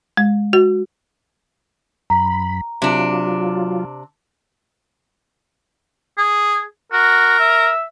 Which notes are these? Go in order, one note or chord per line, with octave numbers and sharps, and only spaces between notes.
G#3
F#4
F#2 A#5 B5
C3 F#3 D4 F4
G#4
F#4 A#4
E5